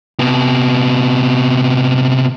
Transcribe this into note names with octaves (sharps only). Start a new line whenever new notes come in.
C3 B3